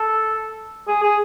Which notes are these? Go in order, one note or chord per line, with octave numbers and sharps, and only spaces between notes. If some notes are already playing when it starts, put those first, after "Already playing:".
Already playing: A4
G#4
G#4